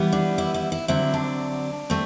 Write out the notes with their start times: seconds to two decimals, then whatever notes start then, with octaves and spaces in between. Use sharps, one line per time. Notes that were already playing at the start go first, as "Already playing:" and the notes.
Already playing: E3 G3 B3
0.13 D4
0.38 E4
0.54 E4
0.72 E4
0.88 D3 F#3 C4 E4
1.14 D4
1.90 A3 C4